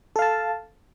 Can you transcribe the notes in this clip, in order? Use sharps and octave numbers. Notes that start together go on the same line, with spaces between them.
A4 F5 A5